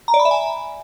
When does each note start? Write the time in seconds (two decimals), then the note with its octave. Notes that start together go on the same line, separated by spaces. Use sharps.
0.08 A#5
0.14 D5
0.20 B5
0.25 E5
0.31 G#5